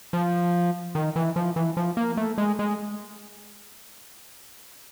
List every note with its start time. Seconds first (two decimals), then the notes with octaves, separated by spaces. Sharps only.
0.13 F3
0.95 D#3
1.16 E3
1.36 F3
1.56 E3
1.77 F3
1.97 A#3
2.17 A3
2.38 G#3
2.59 G#3